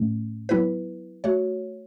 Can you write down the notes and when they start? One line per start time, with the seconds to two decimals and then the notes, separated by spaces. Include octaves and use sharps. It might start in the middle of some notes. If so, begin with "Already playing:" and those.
Already playing: A2 A3 C#4
0.49 F#3 B3 E4 B4
1.24 A3 F#4 C#5